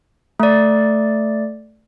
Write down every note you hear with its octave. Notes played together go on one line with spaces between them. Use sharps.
A3 D5